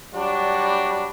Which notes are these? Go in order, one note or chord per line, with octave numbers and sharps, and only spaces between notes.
F#3 G3 D4 F#4